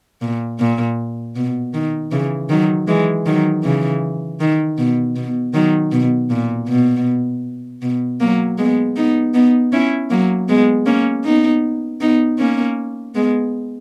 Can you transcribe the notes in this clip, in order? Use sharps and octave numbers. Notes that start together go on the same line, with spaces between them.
A#2
A#2
B2
D#3
C#3 E3
D#3 F#3
E3 G#3
D#3 F#3
C#3 E3
D#3
B2
B2
D#3 F#3
B2
A#2
B2
B2
F#3 A#3
G#3 B3
B3 D#4
B3 D#4
C#4 E4
F#3 A#3
G#3 B3
A#3 C#4
B3 D#4
B3 D#4
A#3 C#4
G#3 B3